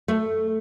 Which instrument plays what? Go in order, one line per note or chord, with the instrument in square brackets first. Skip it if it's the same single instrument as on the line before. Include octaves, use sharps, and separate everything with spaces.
[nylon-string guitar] A3